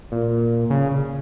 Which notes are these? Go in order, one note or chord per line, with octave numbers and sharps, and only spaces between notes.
A#2
C#3